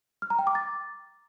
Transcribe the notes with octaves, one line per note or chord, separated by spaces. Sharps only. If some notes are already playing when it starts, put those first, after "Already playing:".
F6
A#5
G5
D6
A6